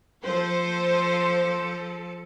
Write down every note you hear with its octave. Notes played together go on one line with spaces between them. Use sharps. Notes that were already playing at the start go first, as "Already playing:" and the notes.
F3 A4 C5